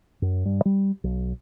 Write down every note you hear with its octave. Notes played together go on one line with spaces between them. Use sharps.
F#2
G2
G3
B1